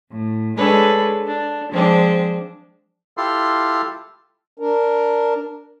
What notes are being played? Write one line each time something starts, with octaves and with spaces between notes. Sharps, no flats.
A2
G#3 D4 G#4 A4 B4 C#5
D4
F3 G#3 C4 D4
E4 F4 G4 A4 C6
D4 A#4